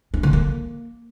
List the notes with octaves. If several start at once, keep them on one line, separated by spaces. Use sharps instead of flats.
D4
D3
A#3